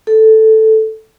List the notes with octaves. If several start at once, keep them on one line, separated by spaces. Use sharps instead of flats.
A4